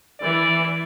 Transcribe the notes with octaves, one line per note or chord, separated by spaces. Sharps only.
E3 D5